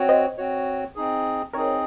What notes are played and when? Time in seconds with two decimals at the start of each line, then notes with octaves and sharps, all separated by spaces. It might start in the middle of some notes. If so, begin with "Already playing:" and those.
Already playing: C4 F#4 C#5
0.09 C5 D#5
0.38 C4 F#4 C#5
0.96 C4 D#4 G#4
1.53 C4 D#4 G#4 A#4 C#5